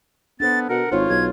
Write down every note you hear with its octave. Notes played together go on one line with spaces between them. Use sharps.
B3 D4 A4 C5 A6
B2 A#4 F#5
G#1 F4 C5 C#5
B1 G#6